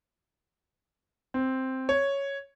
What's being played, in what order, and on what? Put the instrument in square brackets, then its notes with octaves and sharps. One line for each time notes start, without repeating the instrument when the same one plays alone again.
[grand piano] C4
C#5